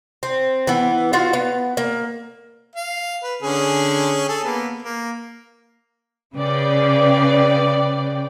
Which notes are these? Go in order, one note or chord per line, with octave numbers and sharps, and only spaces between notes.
C4
E3 B3
F4 F#4 F5
B3
A#3
F5
B4
D3 C#4 G#4
G#4 A4
A#3 B3
A#3
C#3 B4 D5 G5